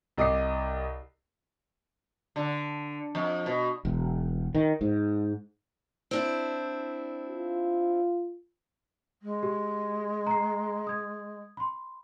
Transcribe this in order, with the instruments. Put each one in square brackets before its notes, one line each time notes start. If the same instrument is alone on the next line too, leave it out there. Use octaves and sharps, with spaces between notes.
[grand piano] C2 D#5 D6 D#6 C7
[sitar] D3
F2
B2
[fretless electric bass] E1
D#3
G#2
[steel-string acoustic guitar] C4 D4 E4
[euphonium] F4
[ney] G#3
[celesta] G4
A#5 C7
D#6 G#6
B5 C6